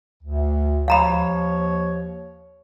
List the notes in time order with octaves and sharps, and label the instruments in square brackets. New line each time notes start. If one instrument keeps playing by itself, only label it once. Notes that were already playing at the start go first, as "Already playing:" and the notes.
[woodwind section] D2
[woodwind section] D#2 F3 C#5 [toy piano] F5 A#5 B5